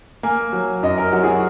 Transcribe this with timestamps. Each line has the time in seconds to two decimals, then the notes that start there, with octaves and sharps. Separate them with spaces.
0.23 A#3 G#5
0.53 F#3
0.83 F#2 D#5
0.98 A#4
1.12 F#3 F#4
1.23 G#4
1.28 F#4